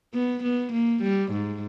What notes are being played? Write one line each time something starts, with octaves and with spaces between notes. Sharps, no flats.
B3
B3
A#3
G3
G#2